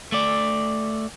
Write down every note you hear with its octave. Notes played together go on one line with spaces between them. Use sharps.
A3 D5